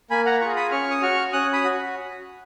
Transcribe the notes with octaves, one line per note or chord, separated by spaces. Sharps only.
A#3 G#5 B5
F#5 A#5
F4 G#4 A#5 C#6
B5 D#6
C#4 C#6 F6
D#6
F#4 C#6 F6
C#4 D#6 F#6
B5 D#6
F#4